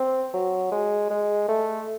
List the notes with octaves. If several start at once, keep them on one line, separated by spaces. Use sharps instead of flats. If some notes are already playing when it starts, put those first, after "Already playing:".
Already playing: C4
F#3
G#3
G#3
A3